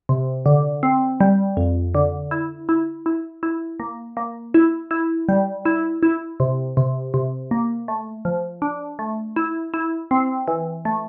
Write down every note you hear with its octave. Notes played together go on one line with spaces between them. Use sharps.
C3
D3
C4
G3
F2
D3
E4
E4
E4
E4
A#3
A#3
E4
E4
G3
E4
E4
C3
C3
C3
A#3
A3
F3
D4
A3
E4
E4
C4
E3
A3